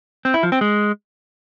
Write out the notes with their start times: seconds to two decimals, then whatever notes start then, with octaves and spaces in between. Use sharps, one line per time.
0.25 C4
0.34 E4
0.43 F3
0.52 C4
0.61 G#3